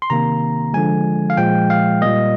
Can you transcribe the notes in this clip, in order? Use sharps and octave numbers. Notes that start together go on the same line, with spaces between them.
C6
C3 D#3 A#3 A#5
D3 F3 G#3 G#5
F5
A#2 F3 G#3 G5
F5
A#2 G3 A#3 D#5